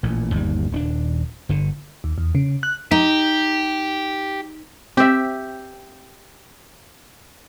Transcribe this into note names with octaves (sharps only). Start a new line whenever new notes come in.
A1 A#2
G1 D#2 G3
D#1 C#4 D4
G1 D3
D#2
E2
C#3
F#6
D#4 G4
C4 G4 E5